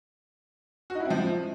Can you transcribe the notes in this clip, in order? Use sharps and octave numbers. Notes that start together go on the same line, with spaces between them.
F#4
D#4
E4
C4
F3